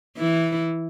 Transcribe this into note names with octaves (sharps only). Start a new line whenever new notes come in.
E3 E4